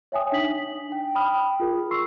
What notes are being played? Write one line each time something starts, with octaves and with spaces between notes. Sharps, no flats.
C#5 E5 G5 G#5 D#6
D4 D#4 B6 F#7
G5
G5 B5 D#6 F6
F4 G#4 A#4
C6 C#6 E6 C7